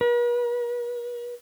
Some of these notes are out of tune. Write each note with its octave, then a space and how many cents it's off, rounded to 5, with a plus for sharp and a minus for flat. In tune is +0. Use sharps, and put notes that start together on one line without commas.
B4 -45